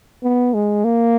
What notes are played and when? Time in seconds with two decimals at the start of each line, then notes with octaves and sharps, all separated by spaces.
0.23 B3
0.54 G#3
0.84 A#3